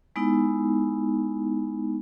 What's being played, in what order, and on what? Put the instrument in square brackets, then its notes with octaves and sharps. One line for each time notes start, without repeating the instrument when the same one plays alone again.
[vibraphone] G#3 B3 D#4 E4